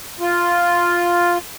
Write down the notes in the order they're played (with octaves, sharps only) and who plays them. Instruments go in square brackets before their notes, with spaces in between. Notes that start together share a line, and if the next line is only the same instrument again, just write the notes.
[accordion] F4